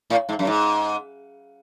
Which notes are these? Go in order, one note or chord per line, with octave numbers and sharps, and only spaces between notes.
A2
G#2
F#2
G#2